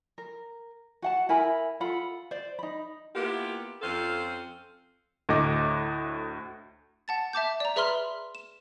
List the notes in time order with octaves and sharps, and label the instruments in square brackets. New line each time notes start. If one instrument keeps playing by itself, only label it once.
[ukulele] A#4
F#4 F#5 A5
E4 A#4 G#5 B5
F4 A4 F#5 B5
C5 D5
D#4 B5
[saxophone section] A#3 B3 E4 F4 G4
F2 C4 C#4 F4 A4 F5
[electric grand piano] D2 A2 D#5 D6
[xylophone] F#5 A5 A6
E5 A5 D6 G6
D5 A#5
G#4 B4 E5 B5 C6 F6
E7